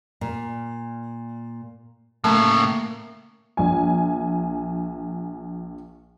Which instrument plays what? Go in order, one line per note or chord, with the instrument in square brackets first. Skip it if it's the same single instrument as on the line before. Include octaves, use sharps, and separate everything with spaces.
[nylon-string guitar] A#2
[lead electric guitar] A2 C#3 [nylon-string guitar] A3 A#3 A5
[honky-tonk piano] A#1 G#5